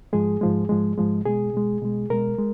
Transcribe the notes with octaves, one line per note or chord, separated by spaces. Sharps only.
G#2 F3 G#3 G#4
G#2 F3 G#3
G#2 F3 G#3
G#2 F3 G#3
B2 G#3 G#4
B2 G#3
B2 G#3
B2 G#3 A#4
G#3